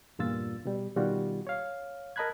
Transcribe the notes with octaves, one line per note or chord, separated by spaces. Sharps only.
E2 G2 A#2 F4 E6 A6
B2 G3
B2 D#3 G3 F4 F#4
C#5 F5
A#4 D#5 A5 B5 F#6 G#6